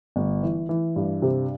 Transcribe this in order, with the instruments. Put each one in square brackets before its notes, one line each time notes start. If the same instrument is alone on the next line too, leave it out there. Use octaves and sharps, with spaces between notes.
[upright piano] G1
E3
E3
G2
C3